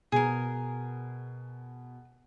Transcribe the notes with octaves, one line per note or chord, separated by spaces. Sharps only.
B2 G#4 A#4